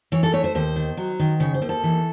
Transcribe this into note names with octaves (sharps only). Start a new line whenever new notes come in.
E3 C#5
A4
A3 C#5
C5
D#2 C5
D#3
F#3
D#3
C#3 C#5
C5
D#2
A4
E3